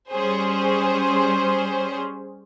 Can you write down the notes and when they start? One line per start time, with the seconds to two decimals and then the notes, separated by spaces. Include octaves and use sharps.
0.11 G3 C#4 G#4 C5